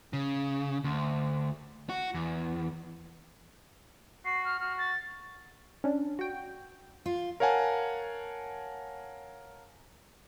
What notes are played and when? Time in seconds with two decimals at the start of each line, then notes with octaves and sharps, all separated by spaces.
0.13 C#3
0.84 D2
1.89 F#4
2.14 E2
4.25 F#4 C7
4.45 F6
4.60 F#4 F6
4.78 A6
5.84 C#4 D4
6.19 F#4 G5
7.06 F4
7.40 A#4 C#5 F5 F#5 G#5 A5